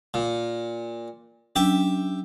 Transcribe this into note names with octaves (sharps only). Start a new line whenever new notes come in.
A#2
F#3 C#4 D4 G4 E5